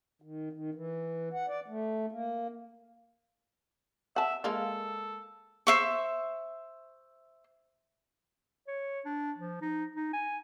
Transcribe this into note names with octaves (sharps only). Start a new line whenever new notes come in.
D#3
D#3
E3
F#5
D5
A3
A#3
E5 F#5 A5
G#3 A#3 F4 A4
C5 E5 C#6
C#5
D4
F3
D#4
D#4
G#5